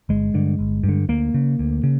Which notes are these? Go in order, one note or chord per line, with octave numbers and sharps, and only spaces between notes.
G1 G#3
G2 D3
G1
G2
D3
D2 A#3
C#3
D2
C#3